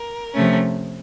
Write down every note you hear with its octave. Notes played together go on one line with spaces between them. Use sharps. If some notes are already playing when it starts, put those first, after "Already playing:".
Already playing: A#4
C3 F3 A3 C#4